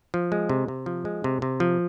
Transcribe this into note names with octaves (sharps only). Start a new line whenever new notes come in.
F3
G#3
C3
C3
F3
G#3
C3
C3
F3